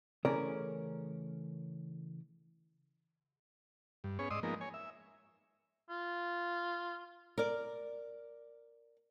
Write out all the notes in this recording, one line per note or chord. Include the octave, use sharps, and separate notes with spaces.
C#3 E3 A3 C#4 A#4 D5
G2
B3 C#4 G#4 C#5
G#2 D5 D#5 C6 D#6 E6
F3 G#3 A#3 B3 D#4 A#4
C#5 G#5
E5
F4
A#4 D5